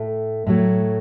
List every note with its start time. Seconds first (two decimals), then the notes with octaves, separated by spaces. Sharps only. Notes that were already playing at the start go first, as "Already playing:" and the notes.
Already playing: A2 A3
0.47 A2 F#3 A3